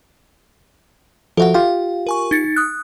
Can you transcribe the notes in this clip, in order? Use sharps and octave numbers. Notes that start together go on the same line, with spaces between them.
F3 F#4 A4 E5 F#5
F4 G4 F5
A#4 G#5 C#6
D#4 A6 C#7
D#6 F#6